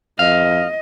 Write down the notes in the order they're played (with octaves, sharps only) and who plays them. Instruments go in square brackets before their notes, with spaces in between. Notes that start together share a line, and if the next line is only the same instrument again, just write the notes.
[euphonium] F2 [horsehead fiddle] D#5 [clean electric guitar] F5